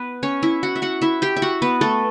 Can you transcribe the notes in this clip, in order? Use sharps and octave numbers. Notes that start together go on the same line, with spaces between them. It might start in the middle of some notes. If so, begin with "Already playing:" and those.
Already playing: B3 B4
C#4 C#5
E4 E5
F#4 F#5
E5
F#4 F#5
E4 E5
G4 G5
E5
F#4 F#5
B3 B4
A3 A4